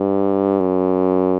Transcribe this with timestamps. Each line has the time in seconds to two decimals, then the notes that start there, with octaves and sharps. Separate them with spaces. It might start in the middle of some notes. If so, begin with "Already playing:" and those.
Already playing: G2
0.60 F#2